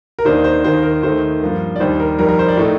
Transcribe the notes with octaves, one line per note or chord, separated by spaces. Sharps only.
A#4
D#2 D#3 A#3 D4 C5
C5
D#2 D#3 A#3 C5
A#4
D#2 D#3 A3 C5
G2 F3 A#3
D5
D#2 D#3 G3 D4 C5
A#4
F2 D#3 G3 A#4
A#4
C5
D5
A2 A3 D#4